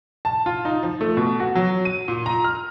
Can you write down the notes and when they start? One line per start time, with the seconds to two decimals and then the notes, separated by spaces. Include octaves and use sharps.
0.25 A5
0.46 F4
0.65 D#4
0.83 F3
1.01 A3
1.17 B2
1.40 F#4
1.56 F#3
1.85 D#7
2.08 A#2
2.26 A#5
2.44 F6